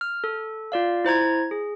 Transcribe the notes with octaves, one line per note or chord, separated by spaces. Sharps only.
F6
A4
F4 D5 F5
E4 C5 A#5 G#6
G#4